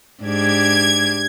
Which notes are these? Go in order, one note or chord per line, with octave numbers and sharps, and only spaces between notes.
G#2 D4 G4 G#6